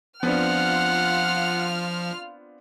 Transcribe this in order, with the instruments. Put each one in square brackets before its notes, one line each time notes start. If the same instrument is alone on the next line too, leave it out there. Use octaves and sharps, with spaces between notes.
[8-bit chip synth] F3 [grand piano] B3 C4 D4 [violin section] F4 F6 [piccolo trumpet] F#5